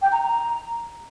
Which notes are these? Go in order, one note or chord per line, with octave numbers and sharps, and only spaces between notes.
G5
A#5
A#5